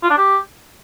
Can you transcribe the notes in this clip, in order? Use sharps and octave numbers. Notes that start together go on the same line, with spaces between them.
F4
D4
G4